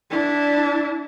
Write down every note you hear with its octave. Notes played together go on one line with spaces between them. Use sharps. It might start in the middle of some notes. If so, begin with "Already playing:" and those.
D4 E4